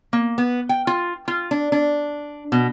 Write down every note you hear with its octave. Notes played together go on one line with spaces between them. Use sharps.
A#3
B3
G5
F4
F4
D4
D4
B2